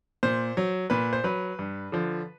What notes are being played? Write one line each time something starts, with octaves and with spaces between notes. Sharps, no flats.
A#2 C5
F#3
A#2 B4
C5
F#3 B4
G2
D3 F3